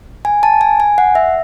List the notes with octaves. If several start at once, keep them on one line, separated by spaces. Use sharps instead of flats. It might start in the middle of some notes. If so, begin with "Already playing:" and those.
G#5
A5
G#5
G#5
F#5
E5